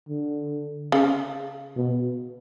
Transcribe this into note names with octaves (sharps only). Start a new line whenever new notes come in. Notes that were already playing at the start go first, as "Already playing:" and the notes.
D3
C#3
B2